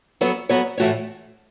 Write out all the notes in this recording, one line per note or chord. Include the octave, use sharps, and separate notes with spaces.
F#3 B3 A4 C#5
F#3 B3 F#4 A4 C#5
A2 E3 A3 F#4 C#5